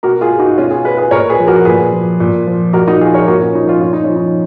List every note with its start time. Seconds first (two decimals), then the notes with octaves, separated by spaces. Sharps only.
0.03 B2 F#4 A#4
0.21 F4 G#4
0.39 D#4 F#4
0.58 B2 C#4 F4
0.71 F4 G#4
0.84 G#4 B4
0.98 G#4 B4
1.11 A#2 A#4 C#5
1.29 G#4 B4
1.39 F3
1.47 F#4 A#4
1.65 A#2 G#4 B4
1.92 F3
2.20 A#2
2.47 F3
2.73 A#2 F#4 A#4
2.87 D#4 F#4
3.00 F3 F4 G#4
3.14 A#4 C#5
3.27 A#2 F#4 A#4
3.42 C#4
3.55 F3 D#4
3.68 C#4 F4
3.82 A#2 F4
3.93 D#4
4.04 F3 C#4
4.16 D#4